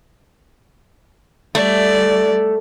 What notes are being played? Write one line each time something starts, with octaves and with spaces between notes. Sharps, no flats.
G3 A3 D5